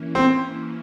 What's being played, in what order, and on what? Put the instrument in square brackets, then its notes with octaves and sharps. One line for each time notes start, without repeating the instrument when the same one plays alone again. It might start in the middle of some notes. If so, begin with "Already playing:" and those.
Already playing: [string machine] E3 A#3 C#4 E4
[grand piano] C4